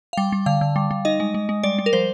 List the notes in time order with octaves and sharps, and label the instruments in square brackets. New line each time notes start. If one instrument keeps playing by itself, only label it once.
[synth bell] F5
G3 G5
G3
D3 F5
D3
G3
G3
D#4 D#5
G#3
G#3
G#3
G3 D5
G3
A#4
F3 C5